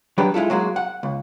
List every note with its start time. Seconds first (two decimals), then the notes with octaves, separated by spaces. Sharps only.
0.18 F#3 G3 D4 G4 B4
0.34 G#3 E4 F4 A4
0.50 F#3 G#3 A#3 F#4
0.76 F#5
1.03 C#2